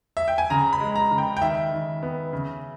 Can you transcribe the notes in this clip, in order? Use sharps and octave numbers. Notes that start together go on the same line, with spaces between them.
E5
G5
G#5
C#3 A#5
B5
G#3
A#5
C#3
G5
G5
D#3 E5
D#3
B3
C#3